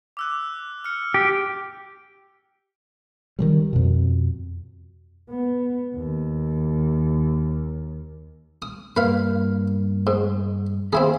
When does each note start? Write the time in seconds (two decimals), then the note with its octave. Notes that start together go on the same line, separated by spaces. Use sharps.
0.17 D6 E6 F#6
0.84 F6 C#7
1.14 G4
3.39 D#3 F3 G3
3.73 F2 B2
5.30 B3
5.95 D#2
8.62 D#6
8.96 G2 A#3 B4 F5
10.07 G#2
10.93 D#2 C4 E4 G#4 B5